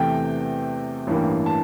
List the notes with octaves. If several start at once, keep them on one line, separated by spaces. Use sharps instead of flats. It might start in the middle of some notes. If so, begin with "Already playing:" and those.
Already playing: E2 C3 E3 A3 G5
A1 G2 E3 A#3
A5